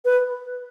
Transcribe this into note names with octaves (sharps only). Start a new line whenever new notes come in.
B4